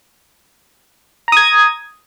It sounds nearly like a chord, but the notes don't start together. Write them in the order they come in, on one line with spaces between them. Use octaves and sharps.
A#5 D#6 G#6